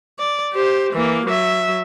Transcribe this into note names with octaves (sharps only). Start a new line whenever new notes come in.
D5
G4 C5
E3 A#3
F#3 E5